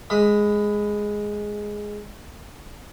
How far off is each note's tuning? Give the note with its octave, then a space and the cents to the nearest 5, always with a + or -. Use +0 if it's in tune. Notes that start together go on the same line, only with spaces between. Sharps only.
G#3 +0 B5 +20